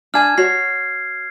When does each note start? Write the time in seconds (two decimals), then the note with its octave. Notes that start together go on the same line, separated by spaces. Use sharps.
0.14 D4 G#5 A5 F6 G#6
0.38 F#4 C#5 C7